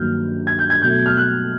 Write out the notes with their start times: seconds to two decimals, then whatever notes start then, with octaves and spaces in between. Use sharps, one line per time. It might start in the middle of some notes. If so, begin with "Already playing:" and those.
Already playing: G2 D#3 F#3 A#3 F6 G6
0.47 G#6
0.59 G6
0.70 G#6
0.82 B2 F#3 A3 G6
1.06 F6
1.17 F#6